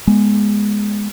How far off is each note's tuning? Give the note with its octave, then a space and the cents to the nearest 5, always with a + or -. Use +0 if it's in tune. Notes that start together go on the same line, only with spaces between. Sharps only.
G#3 +0 B3 -25